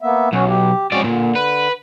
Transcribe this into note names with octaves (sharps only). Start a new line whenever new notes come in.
A#3 B3 E5
B1 C#4 F#4
G4
G#3 C4 C#4 F#4 D5
A#2 D3
B4